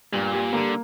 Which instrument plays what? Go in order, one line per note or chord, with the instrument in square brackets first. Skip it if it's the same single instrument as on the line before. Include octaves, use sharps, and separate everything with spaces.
[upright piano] G2 [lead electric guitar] A#2
[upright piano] G3
[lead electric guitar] D3 [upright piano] A#3